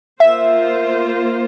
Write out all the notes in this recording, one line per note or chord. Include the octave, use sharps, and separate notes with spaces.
A#3 F4 C5 E5